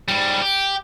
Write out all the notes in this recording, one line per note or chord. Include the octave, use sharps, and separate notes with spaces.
G#2 G3
G4